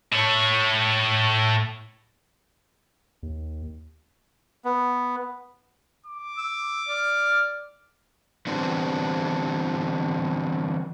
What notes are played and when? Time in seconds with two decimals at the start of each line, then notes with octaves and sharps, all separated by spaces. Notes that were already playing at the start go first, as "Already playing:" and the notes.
0.12 A2 C#5
3.23 D#2
4.65 B3
6.06 D6
6.38 E6
6.89 D5 F6
8.47 D3 E3 G3 B3 C4 D4